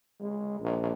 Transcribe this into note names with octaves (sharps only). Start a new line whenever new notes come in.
G#3
A#1